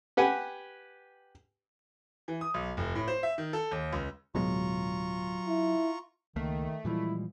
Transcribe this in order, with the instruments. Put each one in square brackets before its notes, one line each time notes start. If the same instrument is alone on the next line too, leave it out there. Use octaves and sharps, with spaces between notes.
[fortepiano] G4 B4 F#5 G#5
[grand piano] E3
D#6
B1
F1
A2
C5
E5
D#3
A4
D#2
C#2
[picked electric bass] D1 B2 G#3 [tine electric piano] F#3 [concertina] F4 A#5 C#6
[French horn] E4
[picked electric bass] C#2 A#3 [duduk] D#3 [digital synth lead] A3
[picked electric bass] A#2 E3 F3 [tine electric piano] G3 G#3 [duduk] E4